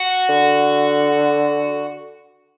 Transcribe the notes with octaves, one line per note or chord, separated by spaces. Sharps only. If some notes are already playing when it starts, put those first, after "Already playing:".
Already playing: F#4
D3